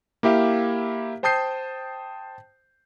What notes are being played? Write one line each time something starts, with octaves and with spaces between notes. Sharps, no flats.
A#3 E4 G4 E5 F5
C5 G5 A5 D#6 G6 C7